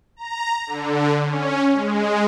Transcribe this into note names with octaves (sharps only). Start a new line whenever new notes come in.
A#5
D3
C#4
G#3